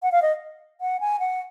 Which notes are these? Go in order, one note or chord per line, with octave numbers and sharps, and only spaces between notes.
F#5
F5
D#5
F#5
G#5
F#5